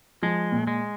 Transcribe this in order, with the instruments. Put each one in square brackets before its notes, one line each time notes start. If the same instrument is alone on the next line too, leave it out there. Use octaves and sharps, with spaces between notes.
[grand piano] F3 [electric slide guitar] G#3
[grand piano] A#2
[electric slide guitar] G#3